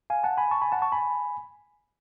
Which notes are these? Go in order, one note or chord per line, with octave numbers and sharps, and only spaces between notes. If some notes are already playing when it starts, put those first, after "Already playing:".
F5 G#5
F#5 A5
G#5 B5
A5 C#6
G#5 B5
F#5 A5
A5 C#6
G#5 B5